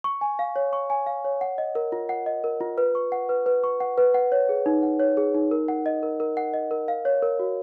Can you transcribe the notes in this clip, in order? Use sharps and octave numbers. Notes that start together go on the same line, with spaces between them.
C#6
G#5
F5
C#5
C#6
G#5
F5
C#5
F#5
D#5
A#4
F4
F#5
D#5
A#4
F4
B4
C#6
F#5
B4
B4
C#6
F#5
B4
F#5
C#5
G#4
D#4
F#5
C#5
G#4
D#4
A#4
F#5
D#5
A#4
A#4
F#5
D#5
A#4
F5
C#5
A#4
F#4